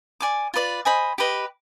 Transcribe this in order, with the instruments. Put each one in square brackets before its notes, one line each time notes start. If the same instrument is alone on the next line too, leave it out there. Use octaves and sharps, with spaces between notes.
[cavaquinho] D5 G#5 D6
F4 B4 D5
C5 D#5 G#5 B5
G4 B4 D#5